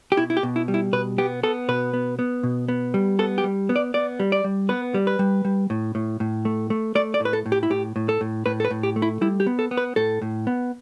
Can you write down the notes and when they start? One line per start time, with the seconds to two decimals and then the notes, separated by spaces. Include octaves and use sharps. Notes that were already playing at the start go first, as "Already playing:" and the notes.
0.12 G4
0.17 B2 E4
0.30 E4
0.37 G4
0.43 B2
0.56 E4
0.68 G3
0.74 E4
0.93 B2 B4
1.18 B3 G4
1.43 B3 A4
1.68 B2 B4
1.94 B3
2.19 B3
2.43 B2
2.68 B3
2.94 G3
3.19 B3 A4
3.38 G4
3.44 G3
3.69 B3
3.76 D5
3.94 B3 D5
4.20 G3
4.32 D5
4.44 G3
4.69 B3 B4
4.94 G3
5.07 B4
5.19 G3
5.45 G3
5.70 A2
5.95 A2
6.20 A2
6.45 A3
6.70 A3
6.95 A3 D5
7.14 D5
7.20 A2
7.25 B4
7.33 A4
7.46 A2
7.52 G4
7.63 E4
7.70 A2 G4
7.96 A2
8.09 A4
8.21 A2
8.46 A2 B4
8.60 A4
8.65 B4
8.71 A2
8.83 G4
8.96 A3
9.02 E4
9.21 G3 E4
9.40 G4
9.47 B3
9.59 A4
9.71 B3
9.77 B4
9.96 A2 A4
10.22 A2
10.47 B3